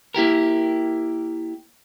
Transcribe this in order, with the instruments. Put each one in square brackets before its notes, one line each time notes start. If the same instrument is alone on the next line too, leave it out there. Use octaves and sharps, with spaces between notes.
[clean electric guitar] A#3 E4 G4 A#4